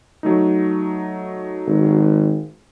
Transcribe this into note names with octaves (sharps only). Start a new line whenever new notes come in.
F#3 A3 D#4
G#1